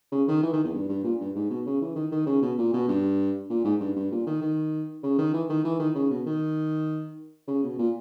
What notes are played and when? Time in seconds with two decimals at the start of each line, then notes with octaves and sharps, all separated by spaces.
0.12 C#3
0.28 D#3
0.43 E3
0.53 D#3
0.64 E2
0.74 G2
0.89 G2
1.04 A#2
1.20 G2
1.36 G#2
1.50 B2
1.66 C#3
1.82 E3
1.96 D#3
2.12 D#3
2.27 C#3
2.42 B2
2.58 A#2
2.74 B2
2.88 G2
3.50 A#2
3.65 G#2
3.80 G2
3.96 G2
4.12 A#2
4.27 D#3
4.42 D#3
5.04 C#3
5.18 D#3
5.34 E3
5.49 D#3
5.65 E3
5.79 D#3
5.95 C#3
6.10 B2
6.26 D#3
7.48 C#3
7.63 B2
7.79 A#2